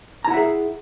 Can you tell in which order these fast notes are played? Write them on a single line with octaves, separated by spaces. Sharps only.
A#5 E4 F#5 E5 G#4